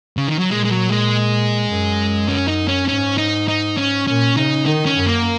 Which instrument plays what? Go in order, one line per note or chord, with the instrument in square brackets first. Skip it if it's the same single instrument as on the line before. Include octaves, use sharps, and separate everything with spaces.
[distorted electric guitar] C#3
D#3
F#3
[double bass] A#2 [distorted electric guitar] G#3
[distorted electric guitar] G#3
F#3
G#3
[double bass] F#2
[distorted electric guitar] C#4
D#4
C#4
[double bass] G#2 [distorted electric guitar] C#4
[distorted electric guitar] D#4
D#4
C#4
[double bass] A#2 [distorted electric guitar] C#4
[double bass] C#3 [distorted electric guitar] D#4
[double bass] D#3 [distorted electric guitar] D#4
[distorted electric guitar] C#4
[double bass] F#2
[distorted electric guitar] A#3